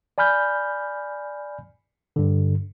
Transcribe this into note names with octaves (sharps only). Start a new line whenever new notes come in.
D5 G#5 B5 F6 G6
G2 D3